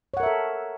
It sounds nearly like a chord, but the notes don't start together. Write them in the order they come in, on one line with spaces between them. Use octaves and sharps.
C#5 F#5 A#4 E5 A4